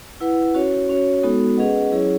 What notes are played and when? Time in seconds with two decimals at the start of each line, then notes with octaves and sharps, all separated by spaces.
0.21 E4 B4 F#5
0.54 C#4 F#4 C#5
0.89 C#4 F#4 C#5
1.23 G#3 B3 D#4 F#4 A4
1.57 C#4 G#4 B4 D#5 F#5
1.91 F#3 C#4 E4 G#4 C#5